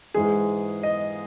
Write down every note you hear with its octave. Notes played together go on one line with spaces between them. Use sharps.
G#2 E3 G#3 G#4
D#5